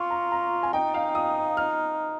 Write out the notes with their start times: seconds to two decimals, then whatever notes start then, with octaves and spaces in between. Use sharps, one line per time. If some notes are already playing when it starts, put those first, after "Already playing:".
Already playing: F4 C#6
0.10 A#5
0.32 A#5
0.63 G#5
0.73 D#4 G5
0.94 F5
1.15 D#6
1.57 F6